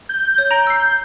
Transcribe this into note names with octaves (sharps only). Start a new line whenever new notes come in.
G6
C#5
A#5 A#6 D7
E6 C7